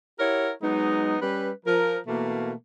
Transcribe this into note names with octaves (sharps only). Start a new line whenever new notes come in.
E4 G4 A#4 C#5 F#5
F#3 G#3 B3 D#4
G3 C#4 B4
F3 A#4
B2 E3 A3 A#3